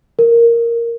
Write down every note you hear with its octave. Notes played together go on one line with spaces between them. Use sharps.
A#4